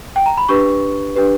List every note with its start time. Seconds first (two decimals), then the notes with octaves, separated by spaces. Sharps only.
0.16 G5
0.26 A#5
0.37 B5
0.49 D4 G4 B4 C#6
1.16 D4 G4 B4